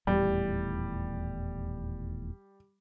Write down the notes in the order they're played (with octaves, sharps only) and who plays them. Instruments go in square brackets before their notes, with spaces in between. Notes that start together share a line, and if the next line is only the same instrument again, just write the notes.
[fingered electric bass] D#1 E2 A2 [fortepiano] G3